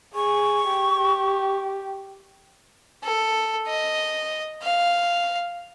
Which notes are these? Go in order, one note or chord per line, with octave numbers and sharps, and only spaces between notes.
G#4 C#6
G4
A4
D#5
F5